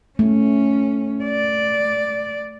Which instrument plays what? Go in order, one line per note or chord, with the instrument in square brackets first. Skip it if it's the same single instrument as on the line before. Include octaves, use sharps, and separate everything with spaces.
[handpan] A3 [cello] C#4
[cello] D5